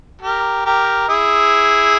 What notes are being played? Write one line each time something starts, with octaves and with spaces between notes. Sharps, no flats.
G4 A#4
G4 A#4
E4 G#4